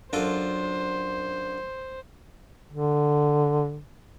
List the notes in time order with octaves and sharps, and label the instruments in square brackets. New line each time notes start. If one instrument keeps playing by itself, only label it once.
[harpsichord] F#2 F4 A4 [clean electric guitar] D4 [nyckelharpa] C5
[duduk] D3